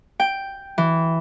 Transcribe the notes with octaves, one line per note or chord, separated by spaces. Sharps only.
G5
E3